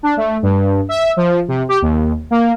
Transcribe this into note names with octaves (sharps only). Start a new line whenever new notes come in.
D4
A3
G2
E5
F3
C3
G4
D#2
A#3